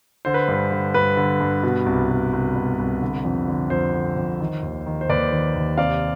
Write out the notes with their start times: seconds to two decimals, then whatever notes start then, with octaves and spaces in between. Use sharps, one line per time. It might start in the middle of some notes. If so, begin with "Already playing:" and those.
0.25 D3 C5
0.34 B4
0.48 G2 B4
0.71 D3
0.94 G2 B4
1.17 D3
1.40 G2
1.63 B2
1.86 C2
2.10 B2
2.33 C2
2.56 B2
2.79 C2
3.02 D3
3.25 F2
3.48 D3
3.70 F2 C5
3.93 D3
4.17 F2
4.40 D#3
4.63 D#2
4.87 D#3
5.01 C5
5.09 D#2 B4 D5
5.32 D#3
5.56 D#2
5.77 C3 D5 F5